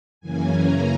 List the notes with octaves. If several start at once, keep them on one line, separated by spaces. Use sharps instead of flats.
F#2 C#3 E3 A#3 C#4 G#5
A#5